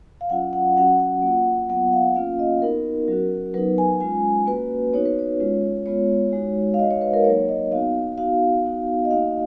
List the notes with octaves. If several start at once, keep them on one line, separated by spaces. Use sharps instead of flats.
F5
F#3 C#4 F4 F#5
F#5
F#3 C#4 F#4 F#5
F#5
A#3 F4
F#3 B3 F4 F#5
F5
A#3 C#4 F4 F5
D#5
B3 D#4 F#4 A#4
F#3 C#4 F#4
F#3 B3 D#4 B4
G#5
G#3 C#4 F4 G#5
A#3 C#4 F#4 B4
B3 D#4 F#4 C#5
B4
C#5
G#3 C#4 F4
G#3 B3 F4 C#5
G#3 D#4 F#4
F5
G#3 D#4 F#4 D#5
C#5
B4
A#4
F#3 A#3 D#4 C#5
D#5
B3 D#4 F#4 F5
B3 D#4 F#4 F5
B3 D#4 F#4
D#5
A#3 D#4 F#4 F5